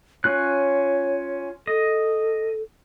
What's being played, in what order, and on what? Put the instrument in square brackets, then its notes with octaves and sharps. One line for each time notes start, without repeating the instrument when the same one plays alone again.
[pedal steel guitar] C#4 F4 F#6 [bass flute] C#5
[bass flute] A4 [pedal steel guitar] D#5